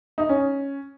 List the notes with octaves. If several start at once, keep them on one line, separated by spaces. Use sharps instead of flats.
D#4
C#4